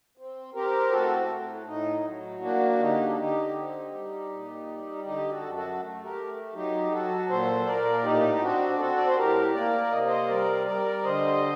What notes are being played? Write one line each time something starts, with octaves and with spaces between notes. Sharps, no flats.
C4
C4 G4 A#4
A2 F#4 A4
A2
A2 D#4
F#3
A#3 D4 F#4
D3 D#4 G4
A4
D3 D#4 G4
C4
G3
A#2
G3
D3 D#4 G4
F#4 A4
F#2
F#4 A4
A3
G4 A#4
A3
F#3 D#4 G4
F#3 F#4 A4
A#2 A4 C5
A#2 A#4 D5
A2 D#4 G4
C4 D4 F#4
C4 F#4 A4
D5
C5
A2 G4 A#4
A#3 A#4 D5
C3 D#5
C5 D#5
G3 A#4 D5
G3 A#4 D5
D3 C5 D#5